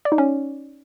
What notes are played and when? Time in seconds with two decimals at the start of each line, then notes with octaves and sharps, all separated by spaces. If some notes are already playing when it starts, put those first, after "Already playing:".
0.05 D5
0.12 D#4
0.18 C#4